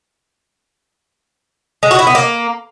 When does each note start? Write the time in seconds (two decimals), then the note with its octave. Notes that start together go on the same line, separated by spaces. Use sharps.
1.83 G#3
1.91 F#4
1.99 E4
2.07 B3
2.15 A#3